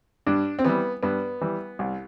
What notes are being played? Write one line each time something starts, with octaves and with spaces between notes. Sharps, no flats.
G2 D4
C4
E3 G3 B3
G2 B3
E3 G3
C2